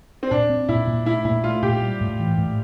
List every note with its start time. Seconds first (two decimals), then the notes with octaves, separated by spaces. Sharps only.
0.23 C4
0.31 A#2 D4
0.50 C4
0.68 A#2 E4
0.87 A#2
1.06 A3 E4
1.25 A#2 E4
1.44 A3 F4
1.62 A#2 G4
1.82 G3
2.01 A2
2.20 E3
2.38 A2